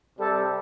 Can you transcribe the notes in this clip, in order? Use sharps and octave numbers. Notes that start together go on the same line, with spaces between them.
C3 G3 A4